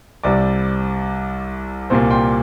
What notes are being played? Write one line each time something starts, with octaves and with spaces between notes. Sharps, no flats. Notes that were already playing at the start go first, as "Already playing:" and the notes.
C2 C3 G3 D5
C2 A#2 G3 A#3 C5
G5 C6